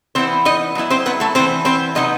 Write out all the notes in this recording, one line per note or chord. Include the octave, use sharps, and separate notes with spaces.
E3 B3 C4 E4 C5
D#4 D#5
F#3 B3 E4
C4 C5
B3 B4
A3 A4
E3 B3 C4 E4 C5
C4 C5
C3 F#3 B3 D#4 D#5